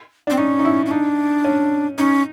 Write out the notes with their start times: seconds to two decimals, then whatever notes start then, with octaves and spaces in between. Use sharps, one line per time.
0.27 C4 D4
0.38 C#4 D#4
0.59 D#4
0.65 E4
0.86 C#4
0.91 D4 D#4
1.45 C#4
1.98 C#4 D#4